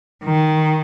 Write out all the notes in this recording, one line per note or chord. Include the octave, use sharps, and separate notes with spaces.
D#3